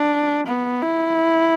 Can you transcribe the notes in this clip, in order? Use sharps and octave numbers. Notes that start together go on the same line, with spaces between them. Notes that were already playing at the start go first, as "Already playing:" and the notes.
Already playing: D4
B3
E4